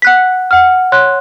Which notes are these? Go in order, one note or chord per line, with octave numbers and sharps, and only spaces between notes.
F#5 F#6 B6
F#5 F6
C#5 C6 F#6